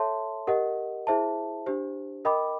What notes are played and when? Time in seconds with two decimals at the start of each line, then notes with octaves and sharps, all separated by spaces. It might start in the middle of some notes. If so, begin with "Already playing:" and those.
Already playing: A4 C#5 E5 A5 C6
0.47 G4 A#4 D#5 F#5
1.07 E4 G#4 C5 E5 A5
1.66 D4 G4 C5
2.25 A#4 D#5 G5 B5 D6